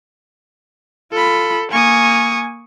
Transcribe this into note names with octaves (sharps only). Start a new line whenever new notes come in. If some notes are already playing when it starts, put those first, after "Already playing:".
F4 A4 B5
A#3 G#5 C#6 D#6